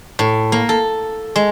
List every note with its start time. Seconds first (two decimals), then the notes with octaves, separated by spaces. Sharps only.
0.19 A2
0.52 A#3
0.69 A4
1.36 G#3